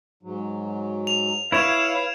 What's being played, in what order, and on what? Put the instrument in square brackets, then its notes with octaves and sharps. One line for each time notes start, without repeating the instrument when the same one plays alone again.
[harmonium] G#2 F#3
[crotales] F7
[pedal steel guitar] E4 C#5 [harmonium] B4 [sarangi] F5 [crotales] G#6 D7 E7